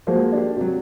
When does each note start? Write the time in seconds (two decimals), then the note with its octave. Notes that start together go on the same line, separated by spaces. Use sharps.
0.07 F3 G#3 A#3 F#4 C5
0.32 D4 G4
0.57 C3 F#3